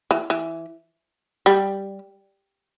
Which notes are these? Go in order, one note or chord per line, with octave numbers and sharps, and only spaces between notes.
E3
E3
G3